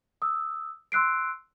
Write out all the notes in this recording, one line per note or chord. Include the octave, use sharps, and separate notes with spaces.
D#6 E6
C6 E6 F#6 C7 D7